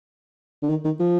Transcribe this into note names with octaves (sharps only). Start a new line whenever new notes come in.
D3
D#3
D#3
F3